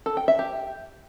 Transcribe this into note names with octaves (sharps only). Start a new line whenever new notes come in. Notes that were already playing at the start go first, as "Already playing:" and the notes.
A4
G5
E5
G4